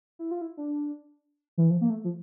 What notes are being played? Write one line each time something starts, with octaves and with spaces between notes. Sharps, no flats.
E4
F4
E4
D4
E3
F3
A#3
A3
F3